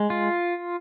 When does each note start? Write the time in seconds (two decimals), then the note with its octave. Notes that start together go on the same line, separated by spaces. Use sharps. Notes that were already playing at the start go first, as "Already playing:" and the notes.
Already playing: G#3
0.10 F4